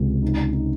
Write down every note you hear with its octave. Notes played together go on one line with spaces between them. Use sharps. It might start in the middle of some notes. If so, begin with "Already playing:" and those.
Already playing: C#2 C3
D#4
D#4